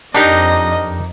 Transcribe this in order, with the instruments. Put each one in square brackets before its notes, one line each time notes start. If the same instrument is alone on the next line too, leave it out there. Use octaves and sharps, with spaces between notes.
[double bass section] F2 [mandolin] A#3 D#4 G6 [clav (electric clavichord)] D4 G4 [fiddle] D#5